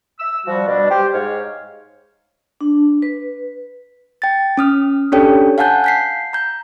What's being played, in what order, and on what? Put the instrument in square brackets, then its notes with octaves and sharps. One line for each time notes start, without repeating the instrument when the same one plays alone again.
[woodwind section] E6
F3 G3 F#4
B2 G3 D4
G4 C5
G#2 C#5 F5
[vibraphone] D4
B4
[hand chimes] G5 A6
C#4 D#6 F6
C#4 D4 G4 A4 C#5 G5
F5 F#5 G#5 A5 F#6 G6
G6 B6 C7
A#5 G6